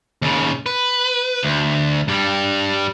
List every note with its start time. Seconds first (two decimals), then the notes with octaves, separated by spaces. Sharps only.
0.22 D#2 C#3
0.66 B4
1.43 D2
2.08 G2 G3